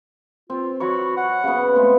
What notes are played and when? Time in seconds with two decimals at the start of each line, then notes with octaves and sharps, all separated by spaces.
0.50 C4 F4
0.80 F#3 E4 F#4 C#5
1.17 F#5
1.44 C#3 B3
1.75 G#3 A3 B3 C4